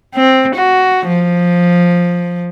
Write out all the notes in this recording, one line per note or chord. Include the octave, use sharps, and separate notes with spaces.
C4
F#4
F3